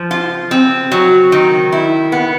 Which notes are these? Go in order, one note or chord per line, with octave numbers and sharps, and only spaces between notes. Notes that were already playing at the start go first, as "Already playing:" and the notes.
Already playing: F3
F4
C4
F#3
D#3
E4
B3